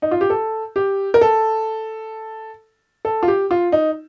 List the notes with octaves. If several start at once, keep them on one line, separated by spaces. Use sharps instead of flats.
D#4
F4
G4
A4
G4
A#4
A4
A4
F4
G4
F4
D#4